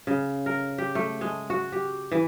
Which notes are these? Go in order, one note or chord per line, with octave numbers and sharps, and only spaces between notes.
C#3
A#4
G4
A3
G#3
F#4
G4
E3